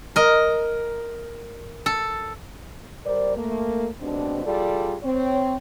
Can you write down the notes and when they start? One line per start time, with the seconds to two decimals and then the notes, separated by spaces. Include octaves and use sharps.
0.16 A#4 D#5
1.86 A4
3.06 G3 A#4 C5 D5
3.37 A3 A#3
4.01 D#2 G#2 B2 C4 D4
4.45 G3 F4 G#4 A4 D5
5.03 C4 C#5